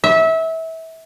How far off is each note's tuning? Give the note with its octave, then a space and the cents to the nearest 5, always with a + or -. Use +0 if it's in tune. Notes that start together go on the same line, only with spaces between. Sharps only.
E5 -25